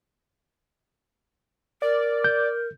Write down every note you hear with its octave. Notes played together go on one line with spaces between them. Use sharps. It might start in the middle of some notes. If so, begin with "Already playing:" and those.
A#4 D5
G6